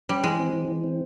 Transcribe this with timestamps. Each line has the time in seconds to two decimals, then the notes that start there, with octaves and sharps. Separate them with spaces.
0.09 G3 C#4
0.24 E3 G#3
0.39 C4
0.53 E3
0.69 E3
0.84 C4